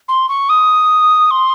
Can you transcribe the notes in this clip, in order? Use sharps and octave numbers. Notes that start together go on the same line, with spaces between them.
C6
C#6
D#6
C6